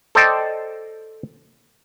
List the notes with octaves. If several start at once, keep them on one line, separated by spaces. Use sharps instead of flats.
A4 C5 D5 D#5 G5 A5